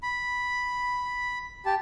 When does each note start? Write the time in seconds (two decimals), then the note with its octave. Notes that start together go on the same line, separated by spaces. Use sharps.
0.03 B5
1.66 G4 A5